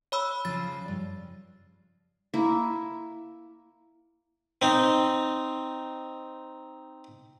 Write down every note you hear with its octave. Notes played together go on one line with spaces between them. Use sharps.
C#5 B5 E6
C#3 F3 A6
G2 D5
A#3 E4
C4 D#4